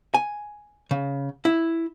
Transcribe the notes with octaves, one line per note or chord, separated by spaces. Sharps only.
G#5
C#3
E4